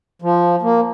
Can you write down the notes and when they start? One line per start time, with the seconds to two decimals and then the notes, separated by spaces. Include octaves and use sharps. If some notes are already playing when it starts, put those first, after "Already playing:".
0.22 F3
0.62 A#3